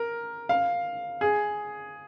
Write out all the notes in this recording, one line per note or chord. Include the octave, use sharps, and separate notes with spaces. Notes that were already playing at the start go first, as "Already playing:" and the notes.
Already playing: A#4
F5
G#4